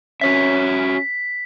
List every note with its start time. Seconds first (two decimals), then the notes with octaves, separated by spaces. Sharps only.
0.21 C#4 F#4 C#5 E5 B6